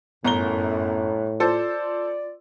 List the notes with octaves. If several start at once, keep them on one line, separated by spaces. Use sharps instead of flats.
G1 F#2 A2 B3 A#5 G7
F4 A4 C5 D5